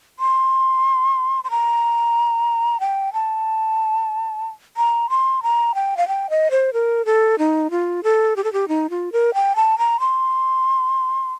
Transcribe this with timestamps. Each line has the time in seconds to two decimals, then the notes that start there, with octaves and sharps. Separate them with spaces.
0.19 C6
1.44 C6
1.50 A#5
2.80 G5
3.13 A5
4.77 A#5
5.09 C6
5.43 A#5
5.75 G5
5.97 F5
6.08 G5
6.30 D#5
6.51 C5
6.73 A#4
7.05 A4
7.38 D#4
7.71 F4
8.03 A4
8.36 G4
8.44 A4
8.53 G4
8.68 D#4
8.90 F4
9.12 A#4
9.34 G5
9.56 A5
9.78 A#5
10.00 C6